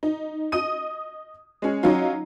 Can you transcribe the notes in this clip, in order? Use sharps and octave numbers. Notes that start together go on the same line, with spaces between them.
D#4
D#5 D#6 D#7
G#3 C#4
F#3 C#4 D#4 F4